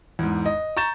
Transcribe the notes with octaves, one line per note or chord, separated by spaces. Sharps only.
E2 G#2
D#5
A#5 C#6 G6 A6 E7